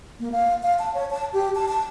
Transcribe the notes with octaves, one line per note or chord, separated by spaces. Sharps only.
A#3
F5
F5
A5
C#5
A5
G4
A5
A5